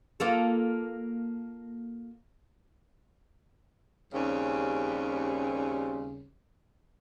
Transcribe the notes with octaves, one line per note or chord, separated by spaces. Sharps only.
A#3 F4 A4
D#2 C#3 G3 C4 C#4